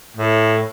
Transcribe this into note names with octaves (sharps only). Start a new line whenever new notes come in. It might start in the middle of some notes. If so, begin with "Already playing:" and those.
A2